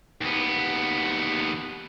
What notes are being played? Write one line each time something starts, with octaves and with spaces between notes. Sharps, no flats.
D#2 B3